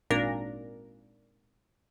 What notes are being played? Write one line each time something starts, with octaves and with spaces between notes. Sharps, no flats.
G#1 A#2 D4 A#4 A#6